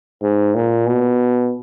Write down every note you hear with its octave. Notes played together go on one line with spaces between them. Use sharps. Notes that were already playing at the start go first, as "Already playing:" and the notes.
G#2
A#2
B2